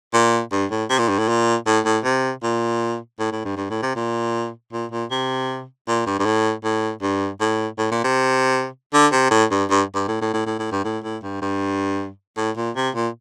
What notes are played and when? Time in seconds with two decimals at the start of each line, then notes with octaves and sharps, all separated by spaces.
0.13 A#2
0.52 G2
0.70 A2
0.90 C3
0.99 A#2
1.09 G2
1.18 A2
1.28 A#2
1.66 A2
1.85 A2
2.04 C3
2.43 A#2
3.19 A2
3.32 A2
3.45 G2
3.57 G2
3.70 A2
3.82 C3
3.95 A#2
4.73 A#2
4.91 A#2
5.10 C3
5.88 A#2
6.06 G2
6.20 G2
6.25 A2
6.64 A2
7.02 G2
7.40 A2
7.78 A2
7.91 A#2
8.04 C3
8.93 D3
9.12 C3
9.31 A2
9.51 G2
9.70 G2
9.94 G2
10.08 A2
10.21 A2
10.33 A2
10.46 A2
10.59 A2
10.72 G2
10.84 A2
11.04 A2
11.23 G2
11.42 G2
12.37 A2
12.57 A#2
12.76 C3
12.95 A#2